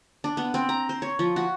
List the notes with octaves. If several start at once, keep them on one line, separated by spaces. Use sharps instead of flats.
D4
B3
C4
A#5
C5
C#5
F3
F#4